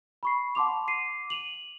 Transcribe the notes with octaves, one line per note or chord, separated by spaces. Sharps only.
B5 C#6 C7
F#5 A5 C6 D6 F7
D6 C7 D#7
D#7 F7 F#7